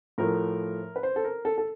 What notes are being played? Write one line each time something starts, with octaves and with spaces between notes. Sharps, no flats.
A2 F3 A3 A#4
B4
C5
A4
A#4
A4
A4